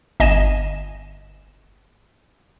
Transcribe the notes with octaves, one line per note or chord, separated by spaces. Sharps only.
G1 D#5 G#5 E7